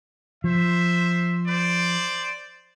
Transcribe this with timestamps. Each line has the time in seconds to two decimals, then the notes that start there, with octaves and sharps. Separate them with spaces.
0.44 F3 C5 E5
1.46 C5 D5